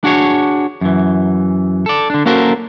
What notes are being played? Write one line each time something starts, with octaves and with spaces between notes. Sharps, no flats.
D4 F#4 G#4 C#5
F#2 E3
A4 D5
D3 D4
A#3 C#4 F#4 A4 A#4 C5